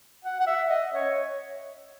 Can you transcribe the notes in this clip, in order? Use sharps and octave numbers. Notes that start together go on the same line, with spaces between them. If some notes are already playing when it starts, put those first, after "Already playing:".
F#5
F#5
E5
D#5
C#5